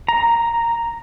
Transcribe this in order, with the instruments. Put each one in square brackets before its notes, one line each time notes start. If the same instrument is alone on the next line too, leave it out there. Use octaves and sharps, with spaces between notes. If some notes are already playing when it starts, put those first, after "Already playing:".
[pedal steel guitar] A#5